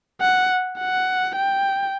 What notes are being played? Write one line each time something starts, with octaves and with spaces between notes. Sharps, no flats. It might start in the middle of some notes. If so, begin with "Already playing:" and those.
F#5
F#5
G5